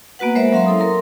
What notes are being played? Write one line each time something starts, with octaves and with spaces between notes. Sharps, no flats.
A#3 B3 F#4 B4 F#5
G#3 A#4 C5 C#5 E5
F#3 C#4 E5 F5 A#5 C6
E4 A4 D#6
A#4 A#5 C6